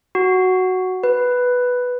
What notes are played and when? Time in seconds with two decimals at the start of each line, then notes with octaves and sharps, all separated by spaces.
0.15 F#4
1.03 B4